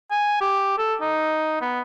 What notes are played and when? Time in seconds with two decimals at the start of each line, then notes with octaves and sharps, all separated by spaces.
0.11 G#5
0.41 G4
0.78 A4
1.01 D#4
1.61 B3